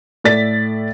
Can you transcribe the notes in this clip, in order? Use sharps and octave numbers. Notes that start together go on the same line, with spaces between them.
A2 A4 D5 A6 B6